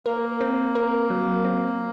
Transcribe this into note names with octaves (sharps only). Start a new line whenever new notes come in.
A#3 A#4
C4
A#4
F#3
C4